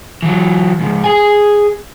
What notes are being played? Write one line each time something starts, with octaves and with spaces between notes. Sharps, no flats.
E3 F#3
C#2 G#2
G#4 G#5